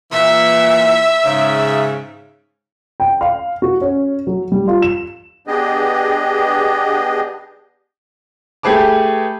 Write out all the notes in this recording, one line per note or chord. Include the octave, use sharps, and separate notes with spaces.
A#2 E3 E5
G#2 C#3
G5
F5
F#4
C#4
F#3
G3
F4
E7
B3 D4 G4 G#4 D#5
A3 G4 G#4 B4 A5 D6